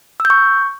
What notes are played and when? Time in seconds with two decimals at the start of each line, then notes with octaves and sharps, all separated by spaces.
0.20 E6
0.25 G6
0.30 C#6